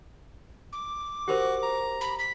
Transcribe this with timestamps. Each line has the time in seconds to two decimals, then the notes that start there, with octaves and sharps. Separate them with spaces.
0.72 D6
1.28 F#4 G4 A#4 C5
1.63 A#5
2.01 B5
2.19 B6